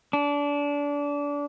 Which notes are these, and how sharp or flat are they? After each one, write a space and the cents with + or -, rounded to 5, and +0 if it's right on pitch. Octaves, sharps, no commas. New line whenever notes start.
D4 -25